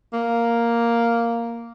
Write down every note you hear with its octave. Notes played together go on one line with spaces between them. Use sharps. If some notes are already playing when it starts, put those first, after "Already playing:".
A#3